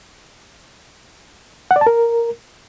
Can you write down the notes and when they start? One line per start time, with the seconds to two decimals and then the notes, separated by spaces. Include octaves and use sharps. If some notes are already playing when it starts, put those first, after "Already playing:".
1.71 F#5
1.76 D5
1.81 A5
1.87 A#4